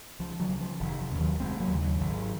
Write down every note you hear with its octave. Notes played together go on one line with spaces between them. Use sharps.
C#2 F3
D#3 F#3
C#3
F3
F1 D#3
F3
D#2 C#3
D#3 F#3
F1 G#3 C4
F#3 A#3
D#2 C#3
D#3 F#3
G#1